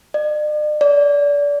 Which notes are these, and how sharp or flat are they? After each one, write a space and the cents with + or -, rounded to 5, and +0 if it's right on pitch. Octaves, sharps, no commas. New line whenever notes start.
D5 +45
D5 -30